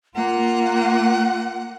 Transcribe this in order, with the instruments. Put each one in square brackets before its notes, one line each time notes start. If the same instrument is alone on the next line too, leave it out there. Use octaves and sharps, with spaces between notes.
[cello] A#3 F4 [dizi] F#5